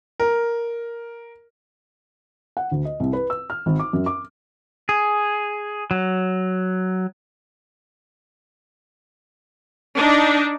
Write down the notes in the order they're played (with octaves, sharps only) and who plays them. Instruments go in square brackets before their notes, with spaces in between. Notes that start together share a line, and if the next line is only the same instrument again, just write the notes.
[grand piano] A#4
[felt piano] F#5
D2
D#5
C2
B4
E6
F6
G#1
D6
F#2
D6
[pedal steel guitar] G#4
F#3
[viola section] D4 D#4